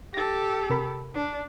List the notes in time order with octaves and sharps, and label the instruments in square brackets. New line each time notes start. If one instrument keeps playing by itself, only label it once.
[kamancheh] G4 A4 [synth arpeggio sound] A6 A#6
[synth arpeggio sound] C3 A#4 B5
[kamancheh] D4